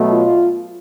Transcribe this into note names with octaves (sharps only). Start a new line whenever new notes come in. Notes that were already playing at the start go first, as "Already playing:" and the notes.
Already playing: B2 F#3 A3
F4